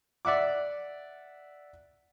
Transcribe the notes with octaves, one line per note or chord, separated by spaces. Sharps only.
D5 E5 F#5 D6